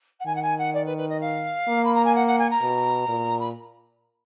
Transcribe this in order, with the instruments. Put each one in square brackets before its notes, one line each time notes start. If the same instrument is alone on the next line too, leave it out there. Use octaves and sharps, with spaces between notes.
[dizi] F#5
[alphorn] D#3 [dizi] G#5
[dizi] F#5
G#5
F#5
D5
B4
B4
D#5
F5
[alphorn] A#3
[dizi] B5
A#5
G#5
F#5
F#5
G#5
A#5
[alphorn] B2
A#2
[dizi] B5